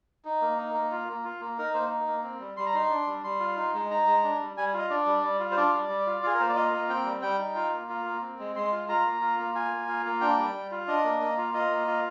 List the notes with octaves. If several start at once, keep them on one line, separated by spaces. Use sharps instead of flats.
D#4
A#3
D#4
A#3
F4
A#3
F4
A#3
D#4 A#4
A#3 C5
D#4
A#3
C4
G3
G3 C6
A#5
D#4 C6
D4
G3
G3 C6
F4
D#4
G#3
D#4 A#5
G#3
D4
G3
G3 G#5
F4 D#5
D4 D5
G3
G3
F4
C5
D4 D5
G3
G3
F4
F4 G#4
A#4
A#3 C5
D5
F4 D#5
A#3 D#5
C4 G5
G3
G3 G5
D#4
F4
A#3
F4
A#3
C4
G#3
G#3 C6
F4
F4 A#5
A#3
F4
A#3
F4 G#5
A#3
F4
A#3
D4 G5
G3
G3
F4
D4 D#5
A#3
A#3
F4
F4 D#5
A#3
F4